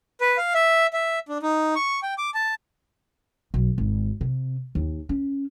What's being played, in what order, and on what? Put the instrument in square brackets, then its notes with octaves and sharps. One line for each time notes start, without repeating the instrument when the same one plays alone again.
[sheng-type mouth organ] B4
F5
E5
E5
D4
D#4
C#6
G5
D6
A5
[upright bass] B1
G#1
C3
D#2
C#4